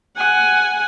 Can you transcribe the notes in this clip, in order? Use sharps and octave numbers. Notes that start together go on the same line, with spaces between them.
F#5 G#5